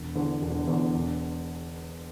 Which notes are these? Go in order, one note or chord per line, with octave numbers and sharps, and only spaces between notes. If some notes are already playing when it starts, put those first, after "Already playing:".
Already playing: E1
E2 D3
E1
E2 D3
E1